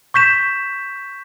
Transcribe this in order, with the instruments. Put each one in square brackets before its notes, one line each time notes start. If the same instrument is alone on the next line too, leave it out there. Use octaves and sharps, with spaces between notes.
[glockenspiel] C#6 G6 B6 E7